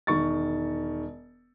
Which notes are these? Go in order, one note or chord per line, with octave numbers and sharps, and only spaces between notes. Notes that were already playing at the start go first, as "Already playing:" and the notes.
E1 D#3 C#6 A6